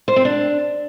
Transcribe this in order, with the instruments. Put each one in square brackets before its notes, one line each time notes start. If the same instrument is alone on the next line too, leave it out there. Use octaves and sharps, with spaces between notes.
[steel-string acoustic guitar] C5
C4
D4